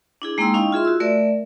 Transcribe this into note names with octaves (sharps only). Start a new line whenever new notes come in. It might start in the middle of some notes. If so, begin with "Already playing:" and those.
D4 E4 G#4
G#3 A#3 D#4 G5 C6 E6
C#4 D#4 E4 D#5 F5 G5
F4 G#4 E5 C6
F#4 E6
A3 A#4 D5 E5